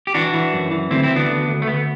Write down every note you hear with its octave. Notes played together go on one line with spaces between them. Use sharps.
G4
E3 D4 F#4
E3
F#2
E3
D2 C4 E4
C4 E4
D2
B3 D4
D2
D2
A3
D2 B3